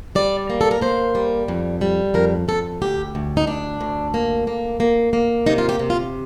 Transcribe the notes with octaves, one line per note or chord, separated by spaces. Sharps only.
G3 D5
A#3
A4
A#4
A#3 C5
G3
F2
G3
F2 A#4
F2 A4
D2 G4
D2
D#4
D2 D4
D2
A#3
A#3
A#3
A#3
C3 D#4
F4
G4
C3
F4